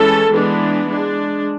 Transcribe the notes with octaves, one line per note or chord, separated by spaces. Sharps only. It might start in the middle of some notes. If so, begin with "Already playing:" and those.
Already playing: E3 G#3 C#4 A4
E3 G#3 B3 D4
G#3 D4